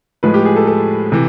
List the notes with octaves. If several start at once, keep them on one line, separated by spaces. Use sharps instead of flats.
A2 F3 G#3 B4
G4
G#4
A4
A4
C3 E3